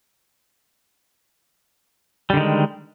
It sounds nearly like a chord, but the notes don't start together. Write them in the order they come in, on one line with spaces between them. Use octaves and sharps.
G3 D3 D#3 G#3